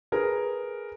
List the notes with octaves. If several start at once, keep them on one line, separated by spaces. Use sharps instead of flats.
G#4 A#4 B4